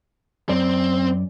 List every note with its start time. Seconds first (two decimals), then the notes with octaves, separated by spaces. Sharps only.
0.49 F#2 C4 D5